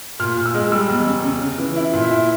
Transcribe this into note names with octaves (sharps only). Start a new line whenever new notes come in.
A#2 F6
A#2
E6
G#3
G3 E6
E2
C#3
C#3
C#3
E3
E4
A#2
E5
E4